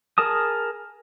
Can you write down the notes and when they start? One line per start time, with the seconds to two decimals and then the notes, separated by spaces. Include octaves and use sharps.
0.18 G#4 A#4 A5 D#6